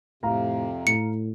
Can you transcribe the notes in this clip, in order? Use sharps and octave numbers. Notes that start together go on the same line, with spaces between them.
F2 A2 C3 F5 A#5
A2 C#7